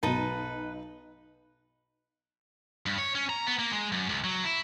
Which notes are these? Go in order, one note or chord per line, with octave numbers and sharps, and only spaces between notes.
B1 B2 D#4 B4 A5
G2
C#5
C#4
A#5
B3
A#3
G#3
F#2
C#2
F#3
E4